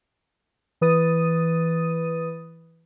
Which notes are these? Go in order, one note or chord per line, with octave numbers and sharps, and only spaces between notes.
E3 B4 D#6 A6 D#7